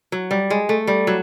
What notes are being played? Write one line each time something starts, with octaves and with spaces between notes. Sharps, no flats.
F#3
G3
G#3
A3
G3
F#3